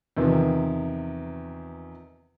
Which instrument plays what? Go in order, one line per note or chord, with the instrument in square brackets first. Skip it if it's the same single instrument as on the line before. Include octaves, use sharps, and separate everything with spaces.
[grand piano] E2 C3 D#3 F3